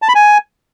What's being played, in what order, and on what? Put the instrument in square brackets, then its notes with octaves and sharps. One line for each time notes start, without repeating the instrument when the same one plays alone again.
[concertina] A5
B5
G#5